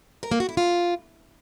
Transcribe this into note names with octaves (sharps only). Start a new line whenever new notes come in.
A#4
A#3
F#4
E4
F4